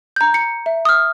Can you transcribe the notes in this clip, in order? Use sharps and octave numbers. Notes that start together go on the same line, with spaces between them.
A#5 G6
C#7
E5
D#6 F6